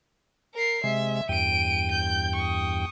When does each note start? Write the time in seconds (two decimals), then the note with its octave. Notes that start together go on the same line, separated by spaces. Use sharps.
0.54 A#4 C7
0.84 C3 G#3 E5
1.29 E2 G2 G5 D7 D#7
1.91 G6
2.36 C#6 D#6